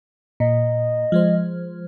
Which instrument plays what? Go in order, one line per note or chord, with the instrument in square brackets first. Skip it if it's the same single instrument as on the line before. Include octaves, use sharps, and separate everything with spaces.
[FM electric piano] A#2 [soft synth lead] D#5
[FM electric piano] F3 G#3 C5